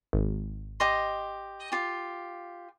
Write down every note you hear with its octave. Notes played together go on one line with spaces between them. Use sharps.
G#1
G4 D#5 C6
F4 G4